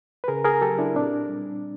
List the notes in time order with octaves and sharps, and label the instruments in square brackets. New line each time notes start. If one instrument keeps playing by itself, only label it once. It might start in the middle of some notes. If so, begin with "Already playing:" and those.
[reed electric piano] B4
C#3 G#4 A#4
G#4 A#4
F#3 G4 A4
D4 E4
A#2 C4 D4
G3